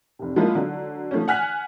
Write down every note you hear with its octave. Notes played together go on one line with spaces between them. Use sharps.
F1 C3
F3 F#3 G#3 A#3 E4 F4
D3 F#3
F3 A3 C#4
F#5 G#5 F6 F#6 B6